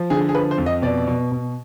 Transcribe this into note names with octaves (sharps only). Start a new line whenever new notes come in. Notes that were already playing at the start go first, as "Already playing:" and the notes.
Already playing: F3
D3 G#4
G#4
F3 B4
C5
F2
D#5
B2 D5
B2
B2